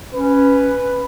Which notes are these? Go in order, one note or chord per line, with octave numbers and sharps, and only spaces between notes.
C#4 B4